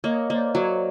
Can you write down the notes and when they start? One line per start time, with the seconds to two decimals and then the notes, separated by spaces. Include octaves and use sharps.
0.04 A#3 C#5 D#5
0.30 A#3 C5 D5
0.55 F#3 C#5